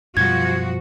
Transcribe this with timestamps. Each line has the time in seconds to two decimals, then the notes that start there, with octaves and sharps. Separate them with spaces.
0.17 F#2 B2 F3 G3 F#4 G#6